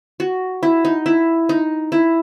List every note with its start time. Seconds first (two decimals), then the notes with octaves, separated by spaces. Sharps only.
0.20 F#4
0.63 E4
0.85 D#4
1.06 E4
1.49 D#4
1.92 E4